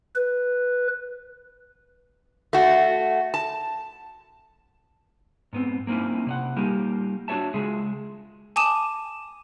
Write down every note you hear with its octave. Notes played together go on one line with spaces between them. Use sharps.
B4
A3 F#4
A5
G#2 B3 C4
A#3 C4 C#4 D#4 E4
C3 D5 F#5
G3 A#3 D#4 G4
D4 F#4 C5 C#5 E5 A5
C#3 G#3 G#4 E5
G#5 A5 D6 D#6 D#7 E7